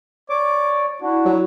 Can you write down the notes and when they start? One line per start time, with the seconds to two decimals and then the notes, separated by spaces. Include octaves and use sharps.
0.30 C#5 D5 D6
1.02 D4 E4 F#4
1.25 F#3